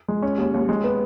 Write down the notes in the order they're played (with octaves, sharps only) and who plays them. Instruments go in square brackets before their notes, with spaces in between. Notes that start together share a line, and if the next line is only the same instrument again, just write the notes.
[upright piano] G#3
C#4
D#2
D#2
G#3
B3